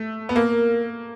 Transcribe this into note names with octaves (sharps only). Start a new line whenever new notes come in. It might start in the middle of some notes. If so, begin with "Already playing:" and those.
Already playing: A3
B3
A#3 A#4